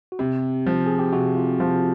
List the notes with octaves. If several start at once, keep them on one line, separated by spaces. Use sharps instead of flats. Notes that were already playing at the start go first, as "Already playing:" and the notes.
F#4
C3 G4
F3
G#4
G4
C3 F#4
F4
F3 F4